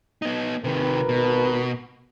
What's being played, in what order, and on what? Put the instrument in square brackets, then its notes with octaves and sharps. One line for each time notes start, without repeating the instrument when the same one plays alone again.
[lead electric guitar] B3 D#4
[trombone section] G#1 A#4 B4 [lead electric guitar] C3 D#3
[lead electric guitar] B2